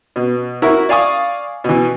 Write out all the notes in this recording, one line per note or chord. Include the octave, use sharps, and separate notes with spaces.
B2
E4 F#4 A#4
D5 F5 G#5 C#6 D#6
B2 E3